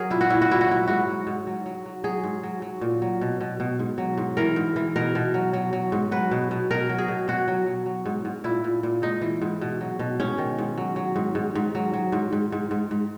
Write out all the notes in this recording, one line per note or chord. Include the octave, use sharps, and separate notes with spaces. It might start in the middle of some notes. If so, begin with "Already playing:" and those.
Already playing: F#3 G#4 A#4
A#2 E4
F#4
A#2 E4
F#4
A#2 E4
F#4
F#3 E4
G#2 F#4
F#3
G#2
F#3
F#3
F#3
F#3 G#4
G#2
F#3
F#3
A#2
F#3
B2
B2
B2
G#2
F#3
G#2
E3 A#4
G#2
E3
B2 A#4
B2
F#3
F#3
F#3
G#2
F#3 B4
B2
B2
B2 A#4
F#3
G#4
B2
B2 F#4
F#3
F#3
F#3
G#2
G#2
A#2 E4
A#2
A#2
G#2 D#4
E3
G#2
B2
F#3
B2
G#2 C#4
D#3
G#2
F#3
F#3
G#2
G#2
G#2
F#3
F#3
G#2
G#2
G#2
G#2
G#2